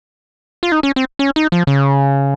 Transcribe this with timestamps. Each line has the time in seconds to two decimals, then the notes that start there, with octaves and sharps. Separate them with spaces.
0.63 F4
0.72 D#4
0.83 C#4
0.96 C4
1.19 C#4
1.36 D#4
1.52 F3
1.67 C#3